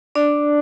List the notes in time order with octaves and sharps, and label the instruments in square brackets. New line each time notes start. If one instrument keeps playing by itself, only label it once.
[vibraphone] D4 D5